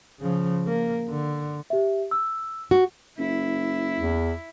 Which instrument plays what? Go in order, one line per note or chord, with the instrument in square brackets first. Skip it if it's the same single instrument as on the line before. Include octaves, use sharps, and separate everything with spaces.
[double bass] C#3 F3
A#3
D3
[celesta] G4 E5
E6
[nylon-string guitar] F#4
[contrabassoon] F#1 [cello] E4
[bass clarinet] E2